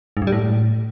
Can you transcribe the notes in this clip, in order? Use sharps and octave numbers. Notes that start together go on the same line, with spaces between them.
G#2
G2
G3
A2